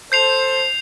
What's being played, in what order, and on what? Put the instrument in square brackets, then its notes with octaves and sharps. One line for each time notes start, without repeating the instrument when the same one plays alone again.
[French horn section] A4 C5 [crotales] G6 C7 F7